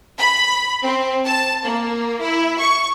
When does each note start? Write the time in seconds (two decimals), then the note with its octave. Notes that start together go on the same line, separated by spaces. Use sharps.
0.19 B5
0.83 C4
1.26 A5
1.63 A#3
2.20 E4
2.59 C#6